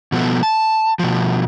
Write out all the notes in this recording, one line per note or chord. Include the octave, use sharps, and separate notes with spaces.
B2 F3 B3 A4
A5
B2 F3